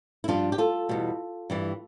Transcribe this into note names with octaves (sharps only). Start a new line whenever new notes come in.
E4
G2 F3 D4 F4
G4
F4 A4
E2 B2 G3
G2 E3 G3